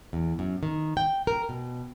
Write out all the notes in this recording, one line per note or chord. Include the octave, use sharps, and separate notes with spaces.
E2
F#2
D#3
G5
A#4
B2